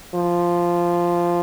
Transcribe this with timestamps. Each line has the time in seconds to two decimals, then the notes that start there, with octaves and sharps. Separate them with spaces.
0.15 F3